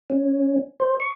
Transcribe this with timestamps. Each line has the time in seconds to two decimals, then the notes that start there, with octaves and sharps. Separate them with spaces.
0.10 C#4
0.80 C5
1.00 C#6